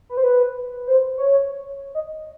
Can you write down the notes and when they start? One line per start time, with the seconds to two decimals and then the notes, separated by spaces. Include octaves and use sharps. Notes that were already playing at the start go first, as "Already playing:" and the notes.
0.09 B4
0.17 C5
0.24 B4
0.87 C5
1.18 C#5
1.95 D#5